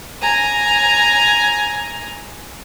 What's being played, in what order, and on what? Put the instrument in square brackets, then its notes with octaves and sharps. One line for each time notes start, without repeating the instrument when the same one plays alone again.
[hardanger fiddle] G#5 A#5